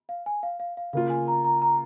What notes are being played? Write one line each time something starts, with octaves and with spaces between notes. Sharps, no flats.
F5
G#5
F5
F5
F5
C#3 A#3 F4 F5
G#5
A#5
A#5
A#5